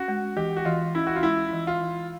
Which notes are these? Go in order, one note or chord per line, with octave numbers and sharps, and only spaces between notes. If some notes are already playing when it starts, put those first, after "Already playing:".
Already playing: C#4 F#4
G#3
E3 G4
F#4
E3 F4
C#4 E4
F#4
F4
G#3 E4
E3
F4
E3